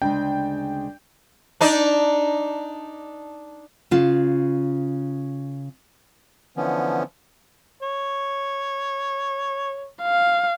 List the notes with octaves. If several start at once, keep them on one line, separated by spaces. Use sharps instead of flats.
D2 C#3 G#3 D4 G5
D4 D#4 D5
C#3 F4
D3 E3 F3 B3 C#4
C#5
F5